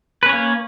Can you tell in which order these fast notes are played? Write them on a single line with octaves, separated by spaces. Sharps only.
B4 C#4 C#5 A#3